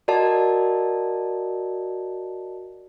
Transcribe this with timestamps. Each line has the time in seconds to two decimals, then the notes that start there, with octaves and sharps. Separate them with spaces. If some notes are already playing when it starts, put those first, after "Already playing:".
0.08 F#4 A#4 D5 D#5 A5